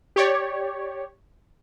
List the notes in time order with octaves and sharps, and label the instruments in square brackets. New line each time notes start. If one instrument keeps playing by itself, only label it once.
[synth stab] G4 C#5 D5